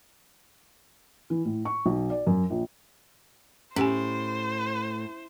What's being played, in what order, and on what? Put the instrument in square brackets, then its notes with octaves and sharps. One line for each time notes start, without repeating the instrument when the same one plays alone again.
[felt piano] E3
A2
C#6
B1
D5
F#2
A#1
[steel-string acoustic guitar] A2 [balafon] C#4 G4 G#5 [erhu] C5